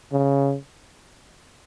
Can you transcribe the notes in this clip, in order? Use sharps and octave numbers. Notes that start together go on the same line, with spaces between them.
C#3